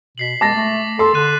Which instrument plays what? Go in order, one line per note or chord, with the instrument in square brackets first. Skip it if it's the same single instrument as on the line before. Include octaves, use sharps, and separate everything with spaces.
[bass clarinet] B2 [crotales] B6 C7 F#7
[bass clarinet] G#3 [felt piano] A5 A#6 [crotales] D6 A6
[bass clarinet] A3
[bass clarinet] A4 [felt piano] C6
[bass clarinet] D3 [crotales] F#6 D#7